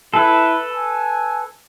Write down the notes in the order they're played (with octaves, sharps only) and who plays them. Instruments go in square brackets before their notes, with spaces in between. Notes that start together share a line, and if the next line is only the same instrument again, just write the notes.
[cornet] E4 [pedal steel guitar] A4 B4
[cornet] G#5